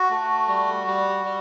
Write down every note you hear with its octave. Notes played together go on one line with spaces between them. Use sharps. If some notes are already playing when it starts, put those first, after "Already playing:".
Already playing: F#4
A3
G3
G3
G3